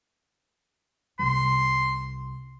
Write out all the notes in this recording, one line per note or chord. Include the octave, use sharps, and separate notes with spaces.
C2 C3 C6